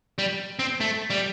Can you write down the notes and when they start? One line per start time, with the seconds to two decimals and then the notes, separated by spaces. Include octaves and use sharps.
0.19 G3
0.59 C4
0.80 A3
1.10 G3